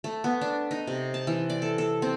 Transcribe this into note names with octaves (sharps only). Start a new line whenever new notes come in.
A3
B3
D4
D#4
C3
A5
E3
D5
A4
A4
C4